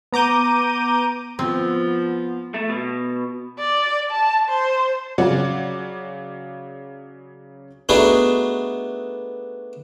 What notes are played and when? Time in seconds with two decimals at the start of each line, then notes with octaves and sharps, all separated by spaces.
0.13 B3 A#5 D6 G6 D#7
1.39 F3 B3 C4
2.54 A3
2.69 B2
3.59 D5
4.12 A5
4.49 C5
5.18 C#3 F#3 D5 F#5
7.89 A3 B3 D4 D#4 F#4 G#4